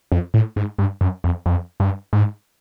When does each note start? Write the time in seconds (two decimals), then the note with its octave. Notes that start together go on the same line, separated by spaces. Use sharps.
0.12 F2
0.34 A2
0.56 G#2
0.79 G2
1.01 F#2
1.24 F2
1.46 F2
1.80 G2
2.13 G#2